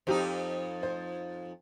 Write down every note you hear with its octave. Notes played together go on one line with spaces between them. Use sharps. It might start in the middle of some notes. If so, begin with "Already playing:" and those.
F2 C4 D#4 G4
C5